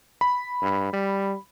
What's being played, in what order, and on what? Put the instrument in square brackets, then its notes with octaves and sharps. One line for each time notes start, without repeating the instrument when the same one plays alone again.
[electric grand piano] B5
[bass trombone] G2
G3